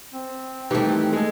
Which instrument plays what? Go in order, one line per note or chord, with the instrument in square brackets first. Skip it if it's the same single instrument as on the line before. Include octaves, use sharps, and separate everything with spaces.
[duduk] C4
[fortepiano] D#3 G3 G4 [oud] E3 A3
[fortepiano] G#3 A4